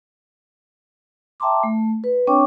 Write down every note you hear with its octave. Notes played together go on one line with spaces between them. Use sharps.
E5 G5 A5 A#5 C6 D6
A3
B4
C4 D4 C#5 G5 C#6 D6